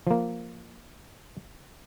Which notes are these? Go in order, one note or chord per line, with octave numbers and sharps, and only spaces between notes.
F3 A#3